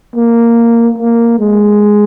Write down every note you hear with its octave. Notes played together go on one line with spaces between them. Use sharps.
A#3
A#3
G#3